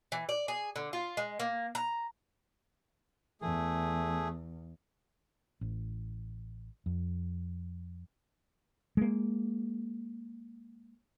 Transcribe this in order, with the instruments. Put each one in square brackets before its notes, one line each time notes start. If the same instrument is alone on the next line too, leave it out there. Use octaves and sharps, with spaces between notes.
[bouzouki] E3
D5
G#4
D3
F4
G#3
A#3
A#5
[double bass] E2 [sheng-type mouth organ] A3 G#4
[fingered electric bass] A1
F2
[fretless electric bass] G#3 A#3